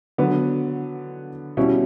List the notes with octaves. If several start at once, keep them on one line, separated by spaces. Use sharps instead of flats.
D3 F#3 B3
B2 G3 C#4 E4